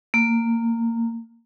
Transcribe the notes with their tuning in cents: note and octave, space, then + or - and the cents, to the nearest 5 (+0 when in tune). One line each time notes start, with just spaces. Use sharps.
A#3 -20